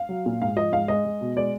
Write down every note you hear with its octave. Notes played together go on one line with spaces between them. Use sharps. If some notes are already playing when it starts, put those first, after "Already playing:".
Already playing: F5
F#3
A#2
G#2 F5
F3 D#5
G#2 F5
G#3 D#5
G#3
B2
G#3 D5